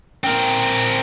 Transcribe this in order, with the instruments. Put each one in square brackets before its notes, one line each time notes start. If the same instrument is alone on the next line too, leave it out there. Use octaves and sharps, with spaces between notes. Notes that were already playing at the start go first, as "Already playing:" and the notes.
[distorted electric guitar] C4 A#4